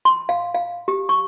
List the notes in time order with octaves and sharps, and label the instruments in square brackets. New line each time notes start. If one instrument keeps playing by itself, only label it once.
[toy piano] C6
F5
F5
G4
C#6